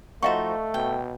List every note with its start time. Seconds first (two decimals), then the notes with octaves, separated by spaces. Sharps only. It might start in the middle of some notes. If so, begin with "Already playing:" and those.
0.22 F3 A3 D#4 F#4 C5 D#5 F5 C#6
0.74 B2 G5